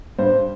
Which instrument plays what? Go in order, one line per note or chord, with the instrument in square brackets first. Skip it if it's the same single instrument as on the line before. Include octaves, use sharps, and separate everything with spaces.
[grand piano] G2 C5